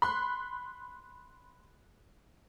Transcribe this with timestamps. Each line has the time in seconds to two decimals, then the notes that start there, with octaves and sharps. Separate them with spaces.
0.02 B5 C6 F#6